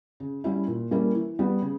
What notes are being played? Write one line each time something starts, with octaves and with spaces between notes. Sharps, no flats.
C#3
G3 C#4 E4
A#2
G3 A#3 C#4 E4
E3
G3 B3
C#3